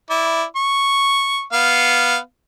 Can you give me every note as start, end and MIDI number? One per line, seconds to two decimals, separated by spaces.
0.10 0.43 64
0.10 0.43 74
0.56 1.42 85
1.53 2.17 59
1.53 2.17 77